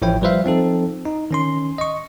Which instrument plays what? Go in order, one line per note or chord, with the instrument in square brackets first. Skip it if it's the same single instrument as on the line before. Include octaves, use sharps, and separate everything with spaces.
[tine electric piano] A1 F3 E4 C#5 G5
F3 G3 B4 C5 E5 F5
F3 C4 D#4 A4
D#4
D#3 C#4 C6
D#5 C#6